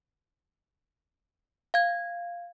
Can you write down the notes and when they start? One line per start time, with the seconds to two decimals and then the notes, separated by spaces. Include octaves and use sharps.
1.74 F5 G#6